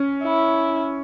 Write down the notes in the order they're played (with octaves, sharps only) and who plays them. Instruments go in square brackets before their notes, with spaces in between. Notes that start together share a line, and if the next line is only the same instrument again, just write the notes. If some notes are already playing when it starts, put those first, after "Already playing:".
Already playing: [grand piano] C#4
[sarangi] E4